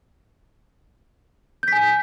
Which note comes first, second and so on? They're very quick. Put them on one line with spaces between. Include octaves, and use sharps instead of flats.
G6 B6 G#5